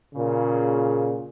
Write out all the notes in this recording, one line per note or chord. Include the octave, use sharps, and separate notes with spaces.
A#2 C#3